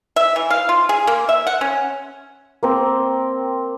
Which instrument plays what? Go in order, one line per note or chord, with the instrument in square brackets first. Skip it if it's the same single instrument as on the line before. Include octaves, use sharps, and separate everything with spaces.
[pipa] E5
E3
F5
F4
G#4
A#3
E5
F#5
C#4
[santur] A#3 C4 A#4